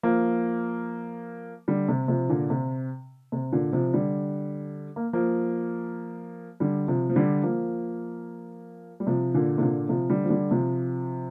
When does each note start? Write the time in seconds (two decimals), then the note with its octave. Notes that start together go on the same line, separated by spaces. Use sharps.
0.03 F3 A#3
1.68 D3 G3
1.88 C3
2.08 C3 F3
2.29 A#2 D3
2.50 C3
3.32 C3
3.52 A#2 D3
3.73 C3 F3
3.94 D3 G3
4.96 A#3
5.13 F3 A#3
6.60 D3 G3
6.88 C3 F3
7.10 F3
7.16 D3 G3
7.43 F3 A#3
9.00 G3
9.07 C3 F3
9.34 A#2 D3
9.58 C3
9.61 A#2 D3
9.89 C3 F3
10.10 D3 G3
10.24 F3
10.30 D3 G3
10.51 C3 F3